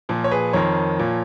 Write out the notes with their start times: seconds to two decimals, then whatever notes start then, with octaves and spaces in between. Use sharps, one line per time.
0.09 A#2 F3
0.24 C#5
0.31 G#4 B4
0.53 F2 D#3 A#4 C#5
0.99 A#2 F3